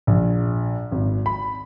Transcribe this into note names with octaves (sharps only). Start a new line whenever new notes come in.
A#1
G#1
B5